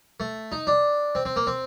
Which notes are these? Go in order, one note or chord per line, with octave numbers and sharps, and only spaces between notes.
A3
D#4
D4
C4
C4
A#3
C4